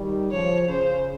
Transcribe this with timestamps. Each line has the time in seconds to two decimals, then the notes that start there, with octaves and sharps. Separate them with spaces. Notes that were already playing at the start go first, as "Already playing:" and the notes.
Already playing: D#3 G3
0.31 C#3 F3 C#5
0.69 C#3 C5